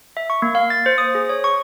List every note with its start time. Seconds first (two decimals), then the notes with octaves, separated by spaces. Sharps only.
0.17 E5
0.30 C#6
0.42 A#3
0.55 F5
0.70 A6
0.86 C5
0.98 D#6
1.15 G#4
1.29 C#5
1.44 C#6